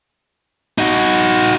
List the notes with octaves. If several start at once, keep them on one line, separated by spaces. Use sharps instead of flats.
D#4 F#4